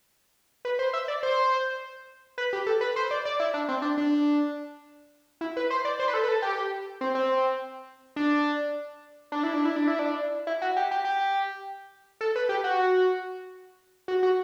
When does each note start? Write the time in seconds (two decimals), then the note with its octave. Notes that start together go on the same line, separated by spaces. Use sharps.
0.65 B4
0.79 C5
0.93 E5
1.08 D5
1.23 C5
2.38 B4
2.53 G4
2.67 A4
2.81 B4
2.96 C5
3.11 D5
3.25 D5
3.40 E4
3.54 D4
3.69 C4
3.82 D4
3.98 D4
5.41 E4
5.57 B4
5.71 C5
5.85 D5
5.99 C5
6.08 B4
6.14 A4
6.23 B4
6.28 A4
6.42 G4
7.01 C4
7.15 C4
8.16 D4
9.32 D4
9.43 E4
9.54 D4
9.65 E4
9.76 D4
9.88 E4
9.99 D4
10.47 E4
10.62 F#4
10.77 G4
10.91 G4
11.05 G4
12.21 A4
12.36 B4
12.49 G4
12.64 F#4
14.08 F#4
14.23 F#4